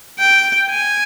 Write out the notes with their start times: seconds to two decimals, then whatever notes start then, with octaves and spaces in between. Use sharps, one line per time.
0.19 G5
0.70 G#5